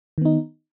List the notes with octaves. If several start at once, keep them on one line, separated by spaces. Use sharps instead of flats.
D#3 B3 D#4